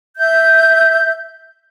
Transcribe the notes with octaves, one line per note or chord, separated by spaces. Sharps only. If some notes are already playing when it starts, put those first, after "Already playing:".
E5 G6